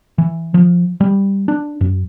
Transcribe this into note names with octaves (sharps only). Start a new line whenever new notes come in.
E3
F3
G3
D4
F#2